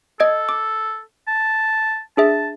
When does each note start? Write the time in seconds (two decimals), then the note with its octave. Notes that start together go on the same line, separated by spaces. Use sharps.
0.20 A4 D#5 G#6 D7
0.49 D6
1.27 A5
2.17 D4 G#4 E5 A5